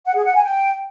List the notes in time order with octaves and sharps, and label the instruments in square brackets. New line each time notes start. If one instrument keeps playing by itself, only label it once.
[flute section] F#5
G#4
F#5
G#5
G5